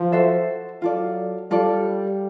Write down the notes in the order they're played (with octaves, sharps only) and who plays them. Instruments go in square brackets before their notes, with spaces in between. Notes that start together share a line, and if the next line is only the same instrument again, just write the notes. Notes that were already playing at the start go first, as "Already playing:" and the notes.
Already playing: [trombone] F3
[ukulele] F#4 A4 C5 E5
[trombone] F#3 [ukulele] F4 A4 D5
[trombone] G3 [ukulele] F4 A4 D5